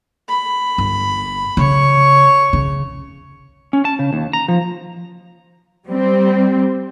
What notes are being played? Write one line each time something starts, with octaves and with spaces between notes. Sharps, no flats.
B5
G1
C#3 C#5 C#6
C#3
C#4
A5
C#3
D#2
A#5
F3
G3 C4